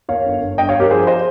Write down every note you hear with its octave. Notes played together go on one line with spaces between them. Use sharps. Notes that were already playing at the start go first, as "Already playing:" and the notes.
D#2 C#5 F5
G1
G1
G2 D#5 G5
C#5 F5
G2
G4 A#4
F3 G#4 C5
C5 D#5